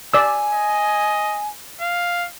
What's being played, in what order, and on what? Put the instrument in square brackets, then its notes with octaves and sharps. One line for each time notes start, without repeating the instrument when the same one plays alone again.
[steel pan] D5 E6 [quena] G#5
[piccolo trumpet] D#5
F5